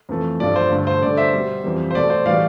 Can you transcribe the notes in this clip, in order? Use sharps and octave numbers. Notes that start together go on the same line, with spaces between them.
F2 E3 A3
G2 F3 A3 D5
C5
G2 D3 A3
C5
G2 D3 A3 D5
C5 E5
B2 G3
F2 E3 G3
C5
B2 A3 D5
C5
A2 E3 G3 D5 F5